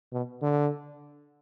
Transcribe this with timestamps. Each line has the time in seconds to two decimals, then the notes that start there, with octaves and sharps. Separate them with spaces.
0.13 B2
0.42 D3